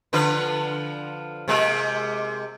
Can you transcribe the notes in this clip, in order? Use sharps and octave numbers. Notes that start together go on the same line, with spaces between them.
D3 F3 B4
C3 G#3 A#3